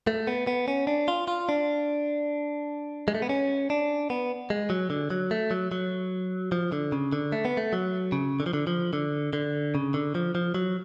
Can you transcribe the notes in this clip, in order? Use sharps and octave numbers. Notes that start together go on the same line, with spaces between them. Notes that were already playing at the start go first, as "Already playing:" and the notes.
A3
B3
B3
C#4
D4
F4
F4
D4
G#3
A3
B3
C#4
D4
B3
G#3
F#3
D3
F#3
A3
F#3
F#3
F3
D3
C#3
D3
A3
B3
A3
F#3
C#3
D3
F3
D3
F3
D3
D3
C#3
D3
F3
F3
F#3